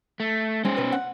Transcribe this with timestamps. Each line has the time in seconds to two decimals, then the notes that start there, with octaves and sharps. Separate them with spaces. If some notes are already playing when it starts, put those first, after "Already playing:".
0.20 A3
0.65 G#3 C#4 C5
0.77 B2 B4
0.92 F#5